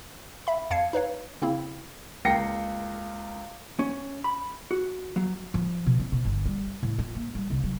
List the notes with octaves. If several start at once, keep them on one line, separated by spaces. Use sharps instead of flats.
E5 B5
F2 F5 A5 G#6 C7 C#7
D#4 B4 C#5 F5
C#3 A#3 C4 E4
C#2 A#3 G5 A#6 C7 C#7
C#4
B5
F#4
F#3
F3
B2
C4
B2
G1
G3
A2
F4
A#3
G3
C2
F#3